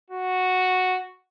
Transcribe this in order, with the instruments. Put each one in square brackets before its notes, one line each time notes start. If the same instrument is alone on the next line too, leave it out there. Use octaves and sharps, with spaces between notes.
[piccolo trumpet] F#4